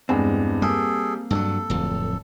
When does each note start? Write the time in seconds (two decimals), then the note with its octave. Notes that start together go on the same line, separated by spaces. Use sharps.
0.09 E2 G2 G#3 C4
0.62 G3 A#3 G#4 A4
1.31 G2 F3 F#3 A4
1.70 D1 F2